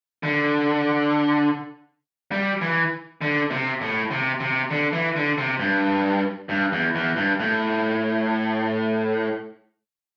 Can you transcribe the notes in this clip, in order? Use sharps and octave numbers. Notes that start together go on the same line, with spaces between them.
D3
G3
E3
D3
C3
A2
C3
C3
D3
E3
D3
C3
G2
G2
E2
E2
G2
A2